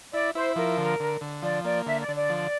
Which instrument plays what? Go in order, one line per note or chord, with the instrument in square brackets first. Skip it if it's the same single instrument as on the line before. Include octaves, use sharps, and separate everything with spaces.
[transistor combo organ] E4 [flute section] D5
[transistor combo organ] E4 [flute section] C5
[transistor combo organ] F3 [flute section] A#4
[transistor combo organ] D3
D3
D3
[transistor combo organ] F3 [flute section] D5
[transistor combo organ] A#3 [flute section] D5
[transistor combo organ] D3 [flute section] E5
[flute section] D5
[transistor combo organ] D3
[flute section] D5
[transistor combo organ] F3